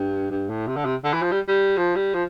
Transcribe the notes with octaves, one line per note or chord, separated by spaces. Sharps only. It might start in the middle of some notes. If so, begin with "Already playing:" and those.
Already playing: G2
G2
A2
C3
D3
C3
D3
E3
F3
G3
G3
F3
G3
F3